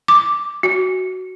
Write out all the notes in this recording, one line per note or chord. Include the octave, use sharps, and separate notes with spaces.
D6
F#4